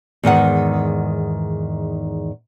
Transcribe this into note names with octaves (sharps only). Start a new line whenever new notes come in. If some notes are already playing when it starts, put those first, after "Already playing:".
E2 G#2 D#3 F#5